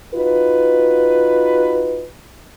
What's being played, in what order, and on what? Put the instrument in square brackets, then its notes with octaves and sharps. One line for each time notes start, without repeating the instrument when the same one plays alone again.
[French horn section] D#4 F4 F#4 B4